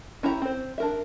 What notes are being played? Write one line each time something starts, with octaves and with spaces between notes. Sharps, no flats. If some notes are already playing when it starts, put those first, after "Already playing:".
C#4 E4 G4 A#5
C4 C5
D4 A#4 E5